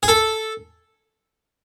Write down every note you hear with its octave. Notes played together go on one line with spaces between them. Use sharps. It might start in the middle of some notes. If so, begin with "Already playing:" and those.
G#4
A4